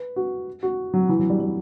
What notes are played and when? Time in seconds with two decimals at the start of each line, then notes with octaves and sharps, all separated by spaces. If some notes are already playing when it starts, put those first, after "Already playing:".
Already playing: B4
0.16 F#4
0.63 F#4
0.94 F#3
1.09 E3
1.19 F#3
1.30 G3
1.40 G3